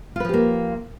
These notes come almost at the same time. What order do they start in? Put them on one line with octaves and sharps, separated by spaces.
F4 B4 F3 G4 A#3